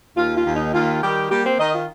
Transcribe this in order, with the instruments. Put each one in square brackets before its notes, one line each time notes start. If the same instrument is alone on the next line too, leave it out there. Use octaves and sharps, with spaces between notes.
[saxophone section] D#2 F4
F4
D#2
D#4
D#2 F4
D#3 G3 G4
G3 A#3 G4
C4 C5
D#3 D#4 D#5
F4